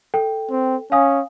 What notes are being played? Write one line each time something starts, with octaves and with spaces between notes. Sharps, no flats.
A4 G5
C4
C#4 F5 G#5 D#6